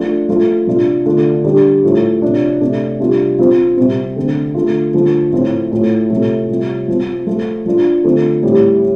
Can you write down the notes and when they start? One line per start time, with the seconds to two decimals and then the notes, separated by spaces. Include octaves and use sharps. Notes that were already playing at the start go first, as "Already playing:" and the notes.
Already playing: F3 A3 D4 F4
0.29 F3 A3 F4
0.67 C3 F3 D4 F4
1.06 D3 A3 D4 F4
1.44 D3 G3 D4
1.83 A2 F3 A3
2.22 C3 F3 D4
2.61 C3 A3 D4
3.00 C3 G3 D4 F4
3.39 F3 C4 F4
3.77 C3 G3 C4
4.16 D3 A3 C4
4.55 D3 A3 F4
4.94 D3 F3 A3
5.33 A2 F3 A3 C4 F4
5.72 A2 A3 F4
6.10 C3 F3 A3
6.49 C3 G3 F4
6.88 F3 C4 F4
7.27 F3 A3 F4
7.66 F3 D4 F4
8.04 D3 F3 A3 C4
8.43 A2 G3 C4